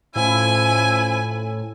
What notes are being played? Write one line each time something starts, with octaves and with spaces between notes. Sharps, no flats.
A2 F3 C#4 E4 G#5